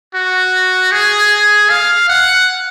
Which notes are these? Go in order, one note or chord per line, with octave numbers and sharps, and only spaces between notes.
F#4
G#4
F5
F#5